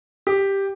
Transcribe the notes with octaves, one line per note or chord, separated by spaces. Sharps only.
G4